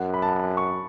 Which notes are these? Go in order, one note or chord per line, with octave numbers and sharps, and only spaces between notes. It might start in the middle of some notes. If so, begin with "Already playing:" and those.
Already playing: F#2 F#5
B5
A5
C#6